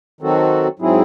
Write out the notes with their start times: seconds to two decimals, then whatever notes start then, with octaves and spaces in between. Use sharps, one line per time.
0.21 D#3 F#3 C4 F#4 A4
0.79 G#2 F#3 C4 E4 G#4